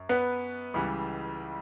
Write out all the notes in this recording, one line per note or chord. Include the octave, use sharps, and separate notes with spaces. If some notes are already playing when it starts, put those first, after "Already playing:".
Already playing: F#2
B3 B4
C#2 C#3 E3 G3